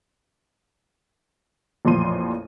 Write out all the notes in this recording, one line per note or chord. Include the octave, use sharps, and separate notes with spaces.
A1 F2 A#2 F3 C6 D#7